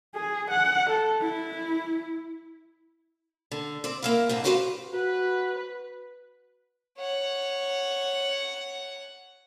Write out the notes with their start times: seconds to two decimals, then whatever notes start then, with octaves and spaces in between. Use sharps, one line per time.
0.15 G#4
0.51 F#5
0.90 A4
1.21 E4
3.51 D3
3.84 C4 D5
4.03 A#3 E4 F5
4.29 G#2 D3 C4
4.44 E4 F#4 G4 B4 C5 F5
4.94 F#4 B4
6.98 C#5 F#5